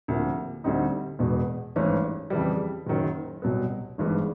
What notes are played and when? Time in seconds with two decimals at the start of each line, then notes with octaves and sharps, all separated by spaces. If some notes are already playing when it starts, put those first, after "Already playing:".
0.08 D2 C3 F3 A#3
0.64 D2 D3 G3 C4 D#4
1.19 E1 E2 B2
1.76 G#1 G2 E3 A3 C#4
2.30 F2 C#3 E3 G3
2.87 F#1 F#2 D#3 F#3
3.42 C2 B2 F#3 B3
3.98 G#1 G2 E3 G#3 B3